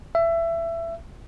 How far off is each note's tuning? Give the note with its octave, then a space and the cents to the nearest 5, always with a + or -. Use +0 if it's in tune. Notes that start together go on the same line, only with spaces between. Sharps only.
E5 +20